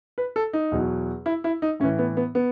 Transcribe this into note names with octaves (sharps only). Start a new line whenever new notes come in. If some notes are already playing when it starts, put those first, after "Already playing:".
B4
A4
D#4
E2 B2 F#3
E4
E4
D#4
A2 E3 C#4
B3
B3
B3